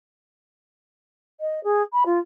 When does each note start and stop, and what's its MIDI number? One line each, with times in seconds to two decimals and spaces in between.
1.40 1.63 75
1.64 1.82 68
1.93 2.04 83
2.06 2.19 65